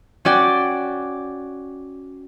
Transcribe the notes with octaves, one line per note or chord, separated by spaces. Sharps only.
C#4 F#4 D5 G5